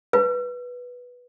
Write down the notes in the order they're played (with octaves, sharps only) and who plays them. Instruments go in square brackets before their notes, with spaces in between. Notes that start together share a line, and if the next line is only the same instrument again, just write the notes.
[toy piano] B4